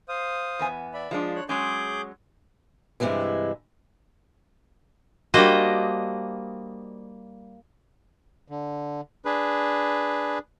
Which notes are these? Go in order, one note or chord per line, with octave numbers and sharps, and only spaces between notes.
C5 F5 D#6
E2 B3 G#5
D5 E5 B5
F3 G#3 D4 F4
C#5 F#6
F#3 G#3 C#4 G#4 D6 G6
G2 C3 D#3 E3 G#3 E4
G3 A#3 D4 F#4 C5 D#5
D3
D4 G#4 B4